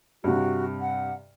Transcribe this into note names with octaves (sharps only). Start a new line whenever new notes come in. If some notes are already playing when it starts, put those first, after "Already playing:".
G2 C3 F#4
F#5